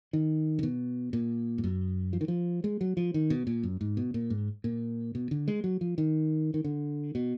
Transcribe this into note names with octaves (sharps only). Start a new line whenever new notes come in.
D#3
D3
B2
A#2
G#2
F#2
F3
D#3
F3
G#3
F#3
F3
D#3
B2
A#2
F#2
G#2
B2
A#2
G#2
A#2
B2
D3
G#3
F#3
F3
D#3
D#3
D3
B2